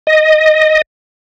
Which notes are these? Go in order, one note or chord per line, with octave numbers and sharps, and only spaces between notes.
D#5